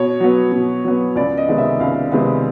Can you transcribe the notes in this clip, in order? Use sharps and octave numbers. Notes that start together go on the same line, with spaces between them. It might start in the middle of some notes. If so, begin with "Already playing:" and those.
Already playing: B2 C#5
F#3 B3
B2
F#3 B3
C#2 D5
D#5
C3 D#3 G#3 B3
E5
C#2 F5
C3 D#3 G#3 B3